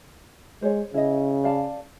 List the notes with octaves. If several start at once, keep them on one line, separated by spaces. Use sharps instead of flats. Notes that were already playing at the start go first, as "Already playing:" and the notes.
G#3 C5 C#5
C#3 E4 D#5
D5 F5 A5